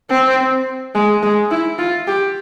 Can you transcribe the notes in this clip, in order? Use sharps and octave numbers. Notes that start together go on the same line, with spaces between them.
C4
G#3
G#3
E4
F4
G4